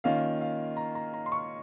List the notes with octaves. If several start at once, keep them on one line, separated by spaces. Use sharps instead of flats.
D#3 A#3 C#4 F4 F5
F5
A#5
A#5
A#5
C6
C#6